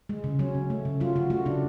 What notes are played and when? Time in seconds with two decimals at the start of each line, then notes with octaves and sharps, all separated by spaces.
0.09 G#3
0.24 C#3
0.39 F#3 C#4
0.55 C#3
0.70 A3
0.85 C#3
1.00 F#3 F4
1.15 C#3 F#4
1.30 A3 F#4
1.46 C#3 D4